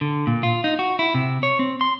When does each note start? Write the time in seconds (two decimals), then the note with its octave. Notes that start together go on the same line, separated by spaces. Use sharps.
0.01 D3
0.27 A#2
0.43 F4
0.64 D#4
0.79 F#4
0.99 E4
1.14 C3
1.43 C#5
1.59 C4
1.81 C6